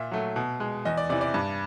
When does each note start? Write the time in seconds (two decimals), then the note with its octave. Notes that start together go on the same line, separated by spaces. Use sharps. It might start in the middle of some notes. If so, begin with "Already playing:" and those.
Already playing: A#2 E5
0.11 F#3 A3
0.36 B2
0.60 G#3
0.85 E2 D#5
0.97 D5
1.09 C3 E3 D5
1.21 D5
1.34 G2